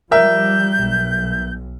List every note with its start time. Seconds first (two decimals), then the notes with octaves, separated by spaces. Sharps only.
0.11 F3 G3 A#4 E5 G6
0.80 B1